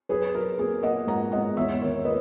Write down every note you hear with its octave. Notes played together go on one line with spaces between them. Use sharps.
F#3 G#4 B4
F#3 A#4
A#3 G#4
A#3 D#5 F#5
G#2 F#5 A#5
G#2 D#5 F#5
E2 C#5 E5
D#3 A#4 C#5
A#3 B4 D#5